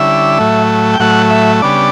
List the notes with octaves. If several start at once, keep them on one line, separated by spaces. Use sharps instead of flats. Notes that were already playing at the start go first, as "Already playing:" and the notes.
Already playing: D3 G3 C#4 E4 E5
A2 F#3 A3
G5
A2 F#3 A3 F#5
E5
C#3 G3 B3 D4 D5